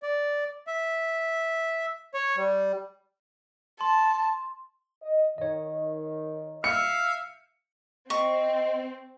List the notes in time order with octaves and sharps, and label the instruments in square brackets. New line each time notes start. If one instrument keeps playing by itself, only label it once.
[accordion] D5
E5
C#5
G3
[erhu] A5 [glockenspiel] C6
[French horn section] D#5
[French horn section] D#3 [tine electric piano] C#5 D#5
[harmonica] E5 F5 [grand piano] C#7
[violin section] C4 [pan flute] D#5 [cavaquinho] C#6